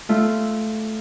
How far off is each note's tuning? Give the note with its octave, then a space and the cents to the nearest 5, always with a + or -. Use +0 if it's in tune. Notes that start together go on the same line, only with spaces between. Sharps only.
A3 -10 F4 -10